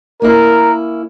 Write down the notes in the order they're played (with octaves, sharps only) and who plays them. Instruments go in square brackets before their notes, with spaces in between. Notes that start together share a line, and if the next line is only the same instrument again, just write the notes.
[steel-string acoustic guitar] A#3 C#4 E4 [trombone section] A#4